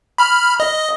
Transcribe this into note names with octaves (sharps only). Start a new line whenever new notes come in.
B5 F6
D#5